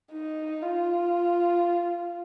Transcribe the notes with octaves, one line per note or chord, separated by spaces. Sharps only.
D#4
F4